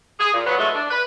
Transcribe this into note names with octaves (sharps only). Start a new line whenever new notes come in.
G#4
A#2
F#3 B3
E3 F#3 G#3 A3
D4
B4